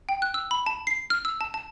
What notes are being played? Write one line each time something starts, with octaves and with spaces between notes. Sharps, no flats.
G5
F#6
E6
B5
A5
C7
F6
E6
A5
A5